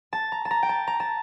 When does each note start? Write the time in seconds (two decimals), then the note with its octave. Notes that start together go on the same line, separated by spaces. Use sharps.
0.13 A5
0.32 A#5
0.45 A5
0.51 A#5
0.63 G5
0.69 A5
0.87 A#5
1.00 A5